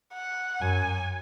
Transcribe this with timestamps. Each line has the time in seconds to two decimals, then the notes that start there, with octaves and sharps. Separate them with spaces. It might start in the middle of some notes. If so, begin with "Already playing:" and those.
0.14 F#5
0.61 F#2 G#5